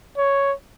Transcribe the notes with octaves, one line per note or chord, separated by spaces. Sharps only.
C#5